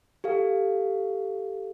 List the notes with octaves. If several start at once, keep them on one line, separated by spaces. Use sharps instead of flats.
G4 A4 F5